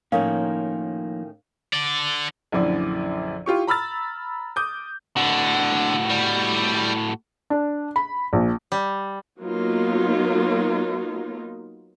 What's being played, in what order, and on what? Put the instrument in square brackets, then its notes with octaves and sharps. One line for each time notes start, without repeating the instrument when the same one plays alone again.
[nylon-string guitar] A2 D#3 C#4 [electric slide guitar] F3 A#3 D#4 [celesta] A#4 F5
[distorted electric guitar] D3 D5
[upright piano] A#1 F#2 D3 E4 D5
E4 F4 G4 C#6
A#5 B5 E6 F6 A6
D6 D#6 G6
[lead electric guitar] A2 F#4 [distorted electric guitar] D3
[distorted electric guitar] G3
[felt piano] D4
B5
A#1
[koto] G3
[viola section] F#3 A#3 B3 D#4 F4